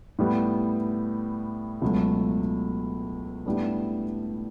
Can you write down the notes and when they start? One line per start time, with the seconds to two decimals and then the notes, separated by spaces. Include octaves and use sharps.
0.19 A2 G3 B3
1.82 C#2 B2 F#3 A3
3.46 A2 G3 B3 D4